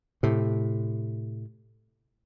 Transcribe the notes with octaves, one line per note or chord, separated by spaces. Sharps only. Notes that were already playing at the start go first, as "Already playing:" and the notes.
A2 C3